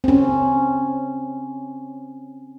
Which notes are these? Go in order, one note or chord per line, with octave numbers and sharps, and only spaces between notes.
C4 C#4